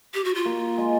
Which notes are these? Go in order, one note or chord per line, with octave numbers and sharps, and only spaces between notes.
G4
F#4
F4
A#3
G#3